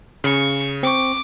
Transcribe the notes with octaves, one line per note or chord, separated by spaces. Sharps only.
C#3 C#6
C4 C#6 D6